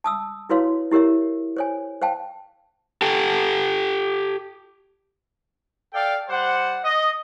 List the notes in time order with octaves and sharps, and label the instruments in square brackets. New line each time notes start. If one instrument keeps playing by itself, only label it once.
[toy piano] A5 D#6 E6
E4 F#4 B4 C#5 F5 C6
E4 G4 A#4 C#5 E5
C5 C#5 G#5
C5 F5 G5 A5
[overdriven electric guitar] G4 A4
[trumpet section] A4 D5 F5 G5
G3 C5 F#5
D#5